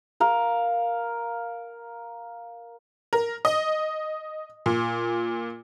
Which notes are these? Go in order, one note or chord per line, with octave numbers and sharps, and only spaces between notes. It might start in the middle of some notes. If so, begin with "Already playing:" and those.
A#4 F5 A#5
A#4
D#5
A#2